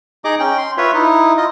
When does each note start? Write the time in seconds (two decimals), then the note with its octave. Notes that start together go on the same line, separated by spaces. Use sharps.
0.25 D#4 G#4 D#5 D6
0.40 C#4 G5
0.58 C6
0.78 F4 B4 C#5 E5
0.94 D#4 E4
1.37 F4 D#5